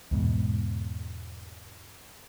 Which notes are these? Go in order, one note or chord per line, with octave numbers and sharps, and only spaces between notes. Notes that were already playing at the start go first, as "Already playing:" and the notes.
E2 G#2 B2